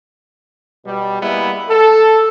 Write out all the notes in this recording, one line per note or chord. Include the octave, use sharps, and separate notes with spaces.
B2 G3
G3 G#3 A#3 B3 E4
A4